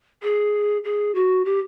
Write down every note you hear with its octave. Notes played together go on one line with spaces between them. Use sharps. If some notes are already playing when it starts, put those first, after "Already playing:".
G#4
G#4
F#4
G4